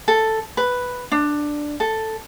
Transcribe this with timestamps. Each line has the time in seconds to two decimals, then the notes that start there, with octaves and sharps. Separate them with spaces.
0.08 A4
0.57 B4
1.12 D4
1.80 A4